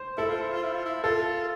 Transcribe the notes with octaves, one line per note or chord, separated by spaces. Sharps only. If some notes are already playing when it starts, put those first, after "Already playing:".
Already playing: C5
E4 A4
F4
E4
F4
E4
F4
E4
F4 A4